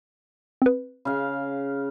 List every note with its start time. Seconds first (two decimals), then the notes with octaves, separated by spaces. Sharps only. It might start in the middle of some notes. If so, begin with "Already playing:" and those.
0.62 C4 B4
1.05 C#3 F5